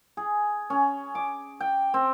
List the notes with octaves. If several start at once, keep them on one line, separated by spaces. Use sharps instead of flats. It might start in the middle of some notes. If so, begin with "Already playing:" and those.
G#4
C#4
D6
G5
C4